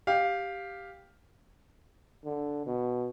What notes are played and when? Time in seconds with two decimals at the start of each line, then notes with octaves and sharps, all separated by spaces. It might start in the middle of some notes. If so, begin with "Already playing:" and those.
0.07 G4 F5
2.25 D3
2.66 B2